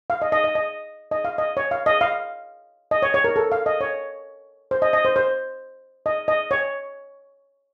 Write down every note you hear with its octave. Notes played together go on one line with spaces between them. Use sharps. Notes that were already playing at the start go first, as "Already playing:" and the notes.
F5
D#5
D#5
D#5
D#5
D#5
F5
D#5
C#5
F5
D#5
F5
D#5
C#5
C#5
A#4
A4
F5
D#5
C#5
C5
D#5
D#5
C5
C5
D#5
D#5
C#5